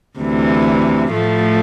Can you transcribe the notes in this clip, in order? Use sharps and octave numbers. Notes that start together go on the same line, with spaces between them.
D2 C3 E3
A2 F3 A3